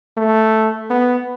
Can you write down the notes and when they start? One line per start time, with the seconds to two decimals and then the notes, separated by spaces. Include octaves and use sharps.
0.17 A3
0.90 B3